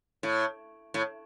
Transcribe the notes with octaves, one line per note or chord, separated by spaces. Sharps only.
A2
A2